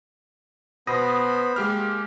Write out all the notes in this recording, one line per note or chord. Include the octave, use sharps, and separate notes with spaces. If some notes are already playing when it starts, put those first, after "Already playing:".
B2 B3 C5 B5 D#6 A#6
G#3 A#3 G4 F6